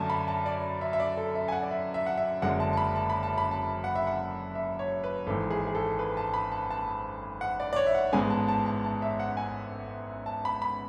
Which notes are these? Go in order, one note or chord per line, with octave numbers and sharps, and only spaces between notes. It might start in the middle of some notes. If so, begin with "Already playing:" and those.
Already playing: F#2 D3 A3 G#5 A5
B5
A5
D5
E5
E5
D5
A4
E5
G#5
F#5
D5
E5
E5
F#5
E5
F#1 F#2 D3 G#3 F#5
A5
A5
B5
A5
B5
A5
B5
A5
F#5
E5
F#5
E5
C#5
B4
G#1 G#2 E3 A4
G#4
G#4
A4
B4
A5
B5
A5
A5
F#5
D5
D5
C#5
E5
F#5
A1 G#2 G#3 B3 G#5
A5
A5
A5
A5
E5
F#5
G#5
A5
B5
B5